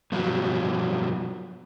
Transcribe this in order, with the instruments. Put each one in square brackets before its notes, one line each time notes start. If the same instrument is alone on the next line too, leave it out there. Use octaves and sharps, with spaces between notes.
[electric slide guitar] G2 B2 F3 F#3